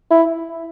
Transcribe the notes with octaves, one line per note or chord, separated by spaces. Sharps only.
E4